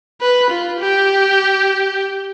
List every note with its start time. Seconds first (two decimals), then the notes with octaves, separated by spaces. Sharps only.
0.21 B4
0.50 F4
0.80 G4